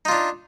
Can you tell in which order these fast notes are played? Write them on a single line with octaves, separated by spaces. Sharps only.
D#4 F4 D4